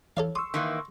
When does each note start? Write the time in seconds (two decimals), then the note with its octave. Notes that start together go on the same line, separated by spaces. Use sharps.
0.17 E3 A4 C#5 F5
0.35 C6 C#6 D#6 E6
0.54 D#3 E3 A#3